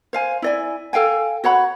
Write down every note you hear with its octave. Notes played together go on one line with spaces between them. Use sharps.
C5 F5 G#5
E4 D5 G#5
A4 F5 G5 G#5
F#4 C#5 F#5 B5